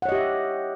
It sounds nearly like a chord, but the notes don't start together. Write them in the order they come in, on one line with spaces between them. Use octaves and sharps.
F#5 C#5 D#5 G4 E5